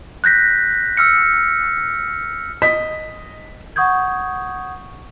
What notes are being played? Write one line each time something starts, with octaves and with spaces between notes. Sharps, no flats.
F#6 G6 A#6 B6
E6 F6 C#7
D#5 B6
F#5 C#6 D#6 G6 G#6